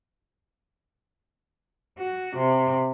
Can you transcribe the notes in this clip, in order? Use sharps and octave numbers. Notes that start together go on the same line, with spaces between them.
F#4
C3